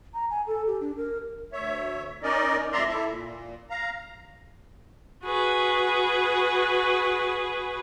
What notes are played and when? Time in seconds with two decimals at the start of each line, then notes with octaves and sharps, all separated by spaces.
0.14 A#5
0.30 G#5
0.47 A4
0.67 G4
0.81 D4
0.97 A#4
1.52 D2 C#5 E5
2.23 C#4 D#4 A#4 D5 D#5
2.72 F2 G#2 D5 E5 A#5 C6
2.88 E4 A4 E5
3.06 A#2
3.70 F5 A#5
5.24 F#4 G#4 B4